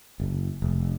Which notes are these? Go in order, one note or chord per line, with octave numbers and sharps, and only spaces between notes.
F#1
F1